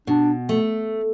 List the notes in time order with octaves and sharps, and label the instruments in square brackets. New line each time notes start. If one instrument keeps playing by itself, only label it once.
[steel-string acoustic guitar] B2 [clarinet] D4
[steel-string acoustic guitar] A3